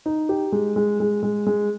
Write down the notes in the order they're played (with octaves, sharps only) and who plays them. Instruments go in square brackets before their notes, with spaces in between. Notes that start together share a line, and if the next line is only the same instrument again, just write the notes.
[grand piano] D#4
G4
G#3
G#3
G#3
G#3
G#3